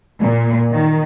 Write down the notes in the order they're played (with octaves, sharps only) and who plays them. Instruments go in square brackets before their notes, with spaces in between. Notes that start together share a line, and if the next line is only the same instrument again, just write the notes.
[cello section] A#2
D#3